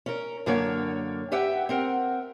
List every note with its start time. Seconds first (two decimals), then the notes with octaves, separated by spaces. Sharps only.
0.06 C#4 A#4
0.46 F#2 D3 A#3 A#4 C#5
1.32 G4 B4 E5 F#5 G5
1.69 C4 A#4 F#5